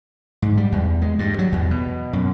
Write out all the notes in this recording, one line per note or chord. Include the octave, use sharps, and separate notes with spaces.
G#2
G3
E2
G#3
G2
F#3
E2
B2
F#2